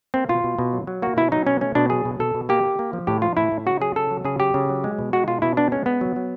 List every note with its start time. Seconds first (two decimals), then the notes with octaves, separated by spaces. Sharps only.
0.14 A#3 C4
0.29 B2 F4
0.44 B2
0.59 B2
0.73 F#3
0.87 F#3
1.02 A#3 F#4
1.17 B2 E4
1.32 F#3 D#4
1.47 B2 C#4
1.61 A3 C#4
1.75 B2 D4
1.90 F#3 G#4
2.05 B2
2.19 B2 A4
2.35 B2
2.49 A#3 G4
2.63 A#3
2.79 A#3
2.93 F3
3.07 A2 G4
3.22 F3 F4
3.37 A2 E4
3.52 A2
3.66 C#3 F#4
3.81 F#3 G#4
3.96 C#3 A4
4.11 F#3
4.25 C#3 G#4
4.40 F#3 G4
4.54 C#3
4.69 F#3
4.84 G#3
4.99 B2
5.13 G#3 F#4
5.28 B2 F4
5.42 B2 E4
5.57 B3 D4
5.72 G#3 C#4
5.86 B3
6.01 F#3
6.16 F#3